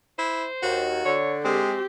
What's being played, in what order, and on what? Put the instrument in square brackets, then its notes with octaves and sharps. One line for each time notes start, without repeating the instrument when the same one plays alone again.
[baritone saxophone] E4 [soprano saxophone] C5
[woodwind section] D#2 [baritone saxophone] F#4
[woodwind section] D3 [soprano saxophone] C#5
[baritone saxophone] G#3 [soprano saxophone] C4 [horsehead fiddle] G4